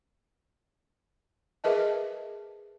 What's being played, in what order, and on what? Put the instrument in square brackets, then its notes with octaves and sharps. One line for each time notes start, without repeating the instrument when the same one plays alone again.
[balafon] G#4 A#4 B4 D#5 E5 A5